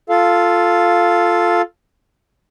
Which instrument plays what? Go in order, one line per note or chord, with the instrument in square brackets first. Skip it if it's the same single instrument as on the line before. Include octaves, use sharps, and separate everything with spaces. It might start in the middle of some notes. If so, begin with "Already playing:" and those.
[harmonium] F4 A4 F5